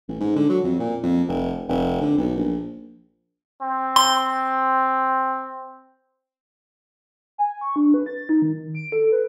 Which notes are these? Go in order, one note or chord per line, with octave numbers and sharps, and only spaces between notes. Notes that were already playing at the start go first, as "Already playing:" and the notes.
A1
G#2
D3
F#3
F2
A#2
F2
F1
F1
D3
B1
A#1
C4
C6
G#5
C#6
D4
B4
A6
D#4
D#3
D7
A4
B4